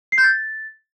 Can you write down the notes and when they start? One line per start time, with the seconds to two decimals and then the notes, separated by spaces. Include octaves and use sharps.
0.12 C7
0.18 G6
0.23 A6